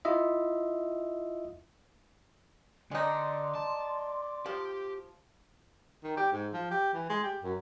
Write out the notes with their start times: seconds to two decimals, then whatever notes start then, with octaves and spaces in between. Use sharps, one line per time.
0.05 E4 F4 D#5 E5
2.91 D3 G#3 D#4 D5 C6
3.55 A5
4.46 F3 G4
6.04 D#3
6.17 G4
6.32 G#2
6.53 F3
6.71 G4
6.94 E3
7.09 G#3
7.23 G4
7.43 F#2